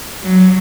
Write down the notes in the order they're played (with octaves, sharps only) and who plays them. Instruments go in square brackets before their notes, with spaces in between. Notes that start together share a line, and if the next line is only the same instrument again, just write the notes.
[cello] F#3